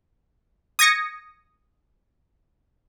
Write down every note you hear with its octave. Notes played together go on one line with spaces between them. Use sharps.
D#6 G#6 A#6 C#7